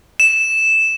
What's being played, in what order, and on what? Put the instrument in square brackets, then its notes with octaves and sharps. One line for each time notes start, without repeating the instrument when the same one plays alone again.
[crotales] E7